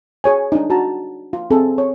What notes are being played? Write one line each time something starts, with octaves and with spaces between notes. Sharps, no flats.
G#4 C#5 G#5
D4 D#4
F#4 A5 A#5
F4
C4 G#4 A4
C#5